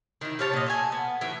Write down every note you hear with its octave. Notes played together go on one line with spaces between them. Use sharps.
D#3 E4
C3 C#4 C#5 A5
A#2 D#5
A3 E5 G#5
B3
A2 E3 E5